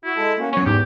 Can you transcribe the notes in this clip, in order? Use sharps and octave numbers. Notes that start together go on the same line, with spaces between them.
E4 F#4
G#3 A4 A5
A#3 C#4 F#4
E2 F#3 C#4 C#5
G#2 G4